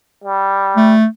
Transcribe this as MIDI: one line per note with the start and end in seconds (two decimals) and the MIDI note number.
0.24 0.95 55
0.76 1.05 57